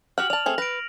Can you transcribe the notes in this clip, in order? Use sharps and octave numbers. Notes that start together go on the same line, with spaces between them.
F#4 G4 F#5 F6 F#7
D5 A5 F7
A3 C4 G#4
B4 A#6 D7